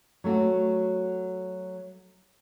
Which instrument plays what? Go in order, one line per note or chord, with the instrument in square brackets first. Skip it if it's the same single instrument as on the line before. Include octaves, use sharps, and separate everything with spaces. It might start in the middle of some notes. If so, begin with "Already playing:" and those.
[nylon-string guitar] F#3 A3 F#4